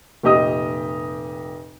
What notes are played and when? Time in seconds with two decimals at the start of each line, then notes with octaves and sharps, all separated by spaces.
0.23 F1 A#2 G4 D#5 D#6